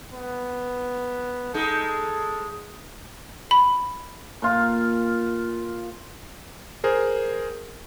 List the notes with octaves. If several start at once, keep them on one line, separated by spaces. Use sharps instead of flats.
B3
G#3 D#4 A4
B5
A#2 F4 F5
G#4 A#4 C5